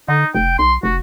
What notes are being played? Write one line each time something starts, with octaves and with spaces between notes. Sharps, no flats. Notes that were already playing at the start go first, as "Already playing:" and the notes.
D3 D#4
F1 G5
B1 C6
F1 F#4